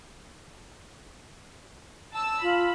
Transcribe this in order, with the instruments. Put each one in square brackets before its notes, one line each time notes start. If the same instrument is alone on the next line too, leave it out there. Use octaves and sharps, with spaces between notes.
[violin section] A5 E6
[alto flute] F4 [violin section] B5